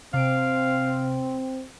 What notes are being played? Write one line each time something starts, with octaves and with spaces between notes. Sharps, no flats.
C3 C4 F5 D7